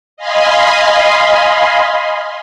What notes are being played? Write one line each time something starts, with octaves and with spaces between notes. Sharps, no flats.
D#5 F5 G#5 B5 C6